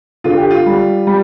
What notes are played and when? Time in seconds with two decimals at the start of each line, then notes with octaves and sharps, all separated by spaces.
0.24 D3 F4
0.37 G4
0.51 F4
0.66 G3
1.07 G3